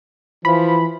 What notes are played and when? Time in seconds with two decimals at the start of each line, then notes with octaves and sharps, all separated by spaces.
0.45 E3 F3 B5